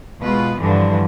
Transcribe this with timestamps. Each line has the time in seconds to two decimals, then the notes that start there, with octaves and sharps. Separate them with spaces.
0.21 B2 G#3 F4 B4
0.59 G2 D3 E3 F3